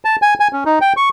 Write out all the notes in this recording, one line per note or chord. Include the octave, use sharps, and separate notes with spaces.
A5
G#5
G#5
C#4
D#4
G5
C#6